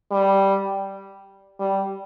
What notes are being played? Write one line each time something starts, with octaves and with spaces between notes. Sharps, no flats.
G3
G3